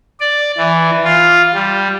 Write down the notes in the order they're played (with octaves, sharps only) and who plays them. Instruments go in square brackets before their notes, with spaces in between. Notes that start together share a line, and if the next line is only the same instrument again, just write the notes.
[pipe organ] D5
E3
F4
G3